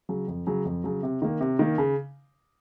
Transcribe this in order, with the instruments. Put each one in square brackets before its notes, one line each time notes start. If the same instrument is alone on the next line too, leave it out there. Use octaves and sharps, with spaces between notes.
[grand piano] C#3 F#3
F2
C#3 F#3
F2
C#3 F#3
C3
D#3 A#3
C3
D#3 A#3
C#3